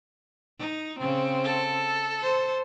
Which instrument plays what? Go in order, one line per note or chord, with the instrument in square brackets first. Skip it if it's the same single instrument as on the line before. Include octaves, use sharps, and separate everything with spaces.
[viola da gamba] D#4
C#3 C4
[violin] A4
[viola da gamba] C5